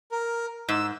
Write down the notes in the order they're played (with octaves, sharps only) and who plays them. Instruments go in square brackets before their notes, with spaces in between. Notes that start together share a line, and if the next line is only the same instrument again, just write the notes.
[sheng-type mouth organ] A#4
[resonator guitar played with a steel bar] G#2 [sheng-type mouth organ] E6